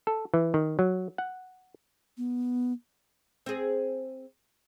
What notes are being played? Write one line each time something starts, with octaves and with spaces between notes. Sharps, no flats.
A4
E3
D#3
F#3
F#5
B3
C4 G#4